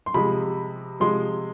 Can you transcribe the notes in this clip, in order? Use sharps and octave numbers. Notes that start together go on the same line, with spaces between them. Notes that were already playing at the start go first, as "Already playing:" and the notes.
C6
C3 F3 G#3 B5
C3 F3 G#3 C6